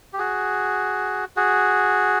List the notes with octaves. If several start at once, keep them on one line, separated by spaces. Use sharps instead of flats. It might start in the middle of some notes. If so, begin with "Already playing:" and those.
G4
F#4 G#4
F#4 G#4